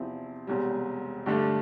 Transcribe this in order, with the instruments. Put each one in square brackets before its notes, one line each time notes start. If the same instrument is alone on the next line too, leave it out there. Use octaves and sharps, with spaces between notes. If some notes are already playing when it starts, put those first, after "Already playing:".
Already playing: [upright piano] E2 C3 F3 C4 E4
E1 E2 C3 G3
G2 D3 A3 D4